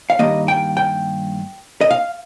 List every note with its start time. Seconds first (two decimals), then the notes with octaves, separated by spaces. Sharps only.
0.10 F5
0.19 G2 D#3 A#3 D#5
0.48 G5
0.77 G5
1.81 D#5
1.91 F5